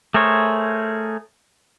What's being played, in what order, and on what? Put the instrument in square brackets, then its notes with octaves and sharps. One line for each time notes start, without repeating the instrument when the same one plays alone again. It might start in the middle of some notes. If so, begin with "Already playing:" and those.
[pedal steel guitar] A3 G#4 A#4 C5 C#5